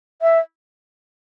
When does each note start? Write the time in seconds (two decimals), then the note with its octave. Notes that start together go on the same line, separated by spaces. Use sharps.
0.22 E5